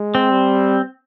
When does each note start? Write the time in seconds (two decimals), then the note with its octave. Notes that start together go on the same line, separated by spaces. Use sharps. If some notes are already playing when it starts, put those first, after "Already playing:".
Already playing: G#3
0.15 C4
0.31 G3